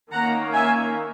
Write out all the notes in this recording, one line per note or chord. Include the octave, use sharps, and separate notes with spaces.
D#3 A#3 C#4 F#5 A#5
E5 G#5